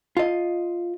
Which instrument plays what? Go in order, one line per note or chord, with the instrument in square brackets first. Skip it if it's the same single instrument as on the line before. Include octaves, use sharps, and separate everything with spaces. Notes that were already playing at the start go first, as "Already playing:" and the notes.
[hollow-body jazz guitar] F4 D#5